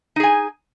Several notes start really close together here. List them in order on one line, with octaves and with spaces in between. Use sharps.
D#4 G#4 G#5